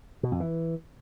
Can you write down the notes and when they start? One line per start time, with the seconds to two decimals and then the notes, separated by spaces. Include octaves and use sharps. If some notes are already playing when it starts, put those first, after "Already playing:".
0.23 B2
0.32 F2
0.40 E3